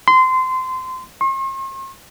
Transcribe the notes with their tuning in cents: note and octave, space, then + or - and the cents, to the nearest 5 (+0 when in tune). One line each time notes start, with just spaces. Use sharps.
C6 -25
C6 +45